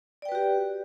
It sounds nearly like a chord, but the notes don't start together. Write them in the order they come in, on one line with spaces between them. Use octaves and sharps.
D5 G5 B4 F#4 G4